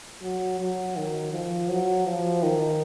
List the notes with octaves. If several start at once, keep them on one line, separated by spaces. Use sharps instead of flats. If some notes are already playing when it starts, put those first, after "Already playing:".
F#3
F#3
D#3
F3
F#3
F3
D#3